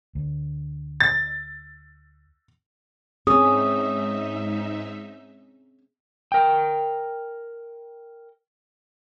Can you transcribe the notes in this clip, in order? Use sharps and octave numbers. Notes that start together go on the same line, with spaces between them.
D2
A6
G#2 C4 C#4 D#4 G#4 E5 D#6
A#4 G5